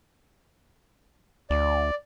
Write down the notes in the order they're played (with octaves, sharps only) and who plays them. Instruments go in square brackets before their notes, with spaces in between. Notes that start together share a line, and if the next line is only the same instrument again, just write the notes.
[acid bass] D2 [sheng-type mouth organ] D5